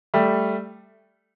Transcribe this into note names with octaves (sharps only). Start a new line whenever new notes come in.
G3 A3